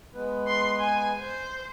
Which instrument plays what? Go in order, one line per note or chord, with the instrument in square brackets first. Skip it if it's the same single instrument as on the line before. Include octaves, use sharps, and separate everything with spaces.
[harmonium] G#3 B3 B4
[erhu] C6
G#5
C5